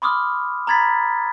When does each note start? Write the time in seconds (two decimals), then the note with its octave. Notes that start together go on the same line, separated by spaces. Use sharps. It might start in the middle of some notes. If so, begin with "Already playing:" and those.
0.02 B5 C6 D6 D#6 F6
0.67 A#5 B5 G#6 A6 B6